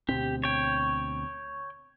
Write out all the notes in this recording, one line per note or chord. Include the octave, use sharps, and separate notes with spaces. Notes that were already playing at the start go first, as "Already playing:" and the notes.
D2 B2 C4 G4
C#5 G5